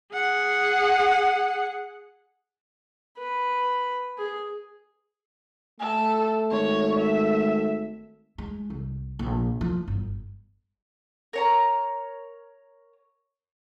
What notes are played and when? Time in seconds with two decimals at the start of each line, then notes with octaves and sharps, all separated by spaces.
0.13 G#4 F#5
3.18 B4
4.18 G#4
5.80 A3 A4
6.52 G#1 C#5
6.99 E5
8.38 G#3
8.70 C2
9.19 A#1
9.61 F3
9.88 G1
11.33 A#4 C#5 A#5